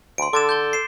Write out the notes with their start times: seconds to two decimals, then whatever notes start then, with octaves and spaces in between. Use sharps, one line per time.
0.18 D2 C6 D7
0.33 D3 A4 D6 A6 E7
0.49 G6 A6 G7
0.73 C7 E7